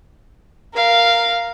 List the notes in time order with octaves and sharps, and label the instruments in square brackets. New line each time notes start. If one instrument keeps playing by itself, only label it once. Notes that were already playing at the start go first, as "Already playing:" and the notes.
[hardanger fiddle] A#4 F5